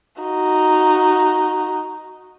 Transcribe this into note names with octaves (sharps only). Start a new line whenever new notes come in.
D#4 F#4